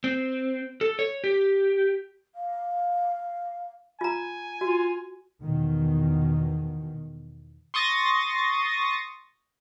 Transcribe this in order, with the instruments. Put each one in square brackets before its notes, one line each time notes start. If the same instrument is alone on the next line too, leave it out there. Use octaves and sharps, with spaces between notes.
[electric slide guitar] C4
A4
C#5
G4
[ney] F5
[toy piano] F4 A#5 [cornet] G#5
[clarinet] F4 [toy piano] F#4
[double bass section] E2 B2 D#3
[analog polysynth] C6 C#6 D#6 A6 A#6